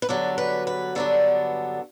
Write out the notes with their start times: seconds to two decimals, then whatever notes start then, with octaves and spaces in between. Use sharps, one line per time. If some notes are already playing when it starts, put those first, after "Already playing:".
0.02 B4
0.09 G2 D3 F#3 B3 D4 A4
0.38 B4
0.67 B4
0.95 G2 D3 F#3 B3 D4 A4